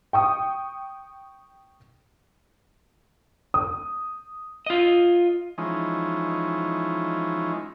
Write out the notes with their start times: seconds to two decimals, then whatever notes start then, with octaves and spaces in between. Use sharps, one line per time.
0.13 G5 C#6 D#6
3.54 D#6
4.66 F4 D#5
5.58 E3 F3 G#3 C#4 D#4